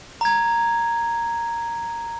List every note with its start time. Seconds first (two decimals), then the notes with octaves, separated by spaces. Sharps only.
0.21 A#5 G#6